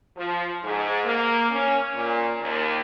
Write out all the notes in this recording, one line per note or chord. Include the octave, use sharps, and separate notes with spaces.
F3
G#2
A#3
C#4
A#2
D#2